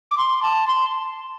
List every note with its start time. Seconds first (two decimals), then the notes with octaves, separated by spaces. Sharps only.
0.11 D6
0.18 C6
0.42 A5
0.67 C6